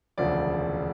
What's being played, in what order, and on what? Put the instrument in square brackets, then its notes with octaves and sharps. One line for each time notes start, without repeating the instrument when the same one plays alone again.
[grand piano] E1 D2 C#3 F3 D5